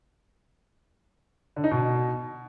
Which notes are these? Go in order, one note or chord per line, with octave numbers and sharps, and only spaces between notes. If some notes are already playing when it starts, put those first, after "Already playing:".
D3
D#4
B2